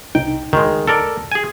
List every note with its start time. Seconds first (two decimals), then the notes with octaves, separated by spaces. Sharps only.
0.15 C2 D#4 G5
0.53 D2 D#3 G#3
0.88 A4 A#4 D5
1.32 G#4 G#5